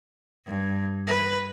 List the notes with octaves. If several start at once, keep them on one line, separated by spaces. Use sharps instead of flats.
G2
B4